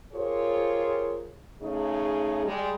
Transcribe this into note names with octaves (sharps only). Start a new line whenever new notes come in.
F4 G4 G#4 A#4 C5 C#5
C#3 A3 D#4 G#4
G3 G#3